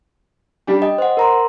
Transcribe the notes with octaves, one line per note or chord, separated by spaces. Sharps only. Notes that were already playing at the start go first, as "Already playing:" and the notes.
G3 D4 G4
D#5 G5
C5 F#5
A#4 A#5 C6